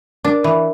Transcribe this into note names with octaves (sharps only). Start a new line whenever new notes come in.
D4 A#4
E3 A#4